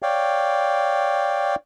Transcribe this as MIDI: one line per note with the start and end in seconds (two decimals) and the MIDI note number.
0.02 1.55 73
0.02 1.55 74
0.02 1.55 77
0.02 1.55 79